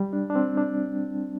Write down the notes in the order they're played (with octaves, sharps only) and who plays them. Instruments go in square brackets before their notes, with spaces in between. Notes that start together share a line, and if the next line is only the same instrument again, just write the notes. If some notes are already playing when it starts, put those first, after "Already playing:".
Already playing: [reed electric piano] G3
D4
D4
C4
D4